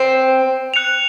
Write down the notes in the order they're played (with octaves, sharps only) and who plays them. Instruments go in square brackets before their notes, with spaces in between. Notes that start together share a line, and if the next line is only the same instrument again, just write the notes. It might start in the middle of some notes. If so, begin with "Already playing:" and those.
Already playing: [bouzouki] C4
[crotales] F#6 C#7 F7